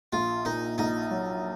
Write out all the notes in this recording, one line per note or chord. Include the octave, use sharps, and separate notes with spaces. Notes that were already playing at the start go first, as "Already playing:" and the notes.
A#1 F4
A#2 D#4
A#1 D#4
F#3